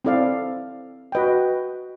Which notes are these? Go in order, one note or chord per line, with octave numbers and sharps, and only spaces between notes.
C4 E4 A4 D5 F5
F#4 B4 D#5 G5